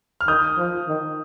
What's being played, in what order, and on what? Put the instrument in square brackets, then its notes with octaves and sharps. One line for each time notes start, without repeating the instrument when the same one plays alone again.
[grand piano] F6
[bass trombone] D#3 [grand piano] D#6 G6
[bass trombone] F3
D#3